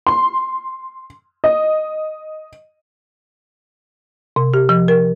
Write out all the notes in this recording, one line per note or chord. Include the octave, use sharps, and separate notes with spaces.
C6
D#5
C3
G4
F3
A#4